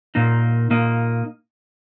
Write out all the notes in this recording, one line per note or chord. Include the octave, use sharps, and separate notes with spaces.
A#2 A#3 D#4
A#2 A#3 D#4